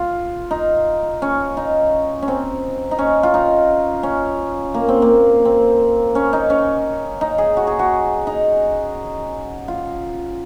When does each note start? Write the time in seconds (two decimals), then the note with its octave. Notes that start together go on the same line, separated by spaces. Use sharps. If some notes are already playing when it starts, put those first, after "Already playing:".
Already playing: F4
0.51 D#4
1.22 C#4
1.57 D#4
2.22 C#4
2.28 C4
2.91 D#4
2.99 C#4
3.23 F4
3.34 D#4
4.03 C#4
4.74 A#3
4.89 C4
5.02 A#3
5.45 C4
6.15 C#4
6.33 D#4
6.50 C#4
7.21 D#4
7.38 G#4
7.57 F#4
7.67 G#4
7.79 F#4
8.27 D#4
9.68 F4